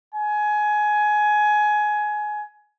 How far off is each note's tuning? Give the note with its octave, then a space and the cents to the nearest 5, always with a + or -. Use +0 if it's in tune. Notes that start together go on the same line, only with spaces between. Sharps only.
G#5 +20